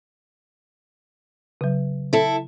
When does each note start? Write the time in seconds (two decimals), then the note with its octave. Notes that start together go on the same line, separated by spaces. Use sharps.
1.61 C#3 F#3
2.13 E4 A4